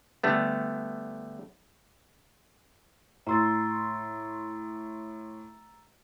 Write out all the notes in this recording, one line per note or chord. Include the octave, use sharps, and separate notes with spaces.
D3 G3 A3 B3
A2 A#5 C6 E6 A6